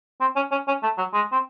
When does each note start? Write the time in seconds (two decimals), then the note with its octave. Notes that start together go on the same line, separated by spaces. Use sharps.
0.21 C4
0.36 C#4
0.52 C#4
0.68 C#4
0.83 A3
0.98 F#3
1.13 G#3
1.32 C4